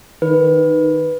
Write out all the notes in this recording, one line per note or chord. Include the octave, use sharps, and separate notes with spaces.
D#3 B4